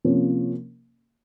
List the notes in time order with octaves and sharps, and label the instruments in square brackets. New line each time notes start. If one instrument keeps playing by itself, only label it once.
[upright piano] C3 F3 A#3 C#4